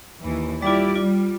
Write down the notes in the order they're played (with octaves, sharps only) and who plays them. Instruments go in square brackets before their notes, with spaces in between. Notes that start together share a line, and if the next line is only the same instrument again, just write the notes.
[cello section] D#2 E3
[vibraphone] G3 F4 [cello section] E4 G4 D5
[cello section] G3 [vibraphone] F4